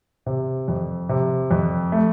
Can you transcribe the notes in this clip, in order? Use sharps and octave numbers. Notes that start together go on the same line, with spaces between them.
C3
F2
C3
F2
A3